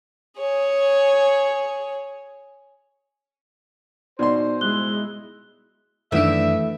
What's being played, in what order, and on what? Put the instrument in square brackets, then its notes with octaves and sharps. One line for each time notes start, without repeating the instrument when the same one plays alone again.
[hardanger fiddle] G#4 C#5
[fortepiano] B2 C6 [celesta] D#4 D5 [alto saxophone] C5
[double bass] G#3 E4 [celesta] F#6 G7
[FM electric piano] F#2 D#3 D4 [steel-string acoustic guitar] E3 A3 [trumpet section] E5